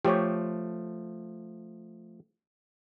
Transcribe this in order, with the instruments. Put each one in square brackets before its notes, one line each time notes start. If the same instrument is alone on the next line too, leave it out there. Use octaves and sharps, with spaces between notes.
[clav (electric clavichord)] F3 A3 [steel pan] G4 C#5